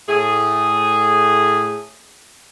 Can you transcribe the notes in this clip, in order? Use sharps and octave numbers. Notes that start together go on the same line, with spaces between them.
A2 A3 G#4